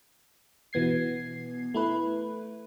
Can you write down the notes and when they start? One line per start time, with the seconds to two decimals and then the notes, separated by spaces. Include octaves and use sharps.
0.73 B2 E3 B3 G#6 C7
1.74 A3 E4 B4